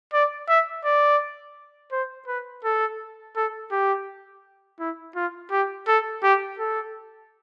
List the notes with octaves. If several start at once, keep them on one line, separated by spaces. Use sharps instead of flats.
D5
E5
D5
C5
B4
A4
A4
G4
E4
F4
G4
A4
G4
A4